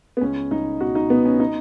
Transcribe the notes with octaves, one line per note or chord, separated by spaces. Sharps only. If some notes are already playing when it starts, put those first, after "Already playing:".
B3
C#2 C#4
C#2 D#4
B2 F#4
D#4
B2 B3
C#4
D#4